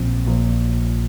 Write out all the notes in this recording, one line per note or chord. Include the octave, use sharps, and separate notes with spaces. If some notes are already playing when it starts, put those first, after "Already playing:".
Already playing: A#1 A#2 F3 C4
A#1 A#2 F3